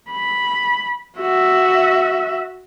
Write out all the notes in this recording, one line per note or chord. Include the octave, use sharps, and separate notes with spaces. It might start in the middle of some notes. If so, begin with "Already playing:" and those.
B5
F#4 E5